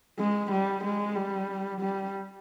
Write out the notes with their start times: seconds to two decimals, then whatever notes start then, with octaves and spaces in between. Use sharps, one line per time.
0.19 G#3
0.52 G3
0.84 G#3
1.16 G3
1.81 G3